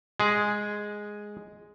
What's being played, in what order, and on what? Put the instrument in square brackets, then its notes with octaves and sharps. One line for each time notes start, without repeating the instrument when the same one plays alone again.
[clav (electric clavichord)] G#3 G#4